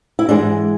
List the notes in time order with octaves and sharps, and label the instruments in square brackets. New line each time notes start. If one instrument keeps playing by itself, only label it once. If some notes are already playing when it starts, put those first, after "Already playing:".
[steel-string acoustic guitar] E4
G#2 E3 G#3 D4